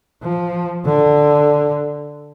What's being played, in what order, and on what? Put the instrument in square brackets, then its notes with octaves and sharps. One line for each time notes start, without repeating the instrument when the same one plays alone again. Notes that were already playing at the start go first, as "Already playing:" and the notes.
[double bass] F3
D3